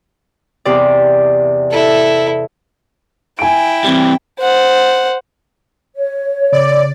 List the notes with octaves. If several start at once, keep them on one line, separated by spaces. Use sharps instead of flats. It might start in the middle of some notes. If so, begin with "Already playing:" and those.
E2 C3 D5
E4 A4
E4 G5 G#5 D7
E3 G3 C4
C5 F#5
C#5
C#3 D5